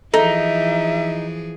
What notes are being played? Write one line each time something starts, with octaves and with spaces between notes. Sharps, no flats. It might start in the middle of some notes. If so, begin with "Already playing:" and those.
E3 F3 D#4 G#4 A4 E5